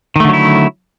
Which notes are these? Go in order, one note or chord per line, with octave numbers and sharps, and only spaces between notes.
D3 D#3 F#3 A3 E4